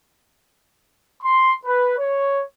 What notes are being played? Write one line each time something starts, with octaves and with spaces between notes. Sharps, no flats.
C6
B4
C#5